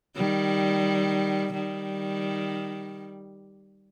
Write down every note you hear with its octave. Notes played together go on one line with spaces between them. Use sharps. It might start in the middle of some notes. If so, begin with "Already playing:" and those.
D#3 G3
D#3 G3